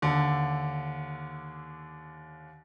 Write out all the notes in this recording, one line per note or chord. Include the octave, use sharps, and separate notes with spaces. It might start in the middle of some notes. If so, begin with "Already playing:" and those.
D#2 D3